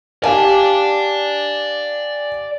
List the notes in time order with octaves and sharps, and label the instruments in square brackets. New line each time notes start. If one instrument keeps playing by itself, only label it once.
[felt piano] G4 F5 G#5 [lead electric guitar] D5 A5